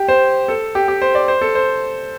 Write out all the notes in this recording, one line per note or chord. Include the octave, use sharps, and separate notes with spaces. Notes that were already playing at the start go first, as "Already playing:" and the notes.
Already playing: G4
C5
A4
G4
G4
C5
D5
C5
A4
C5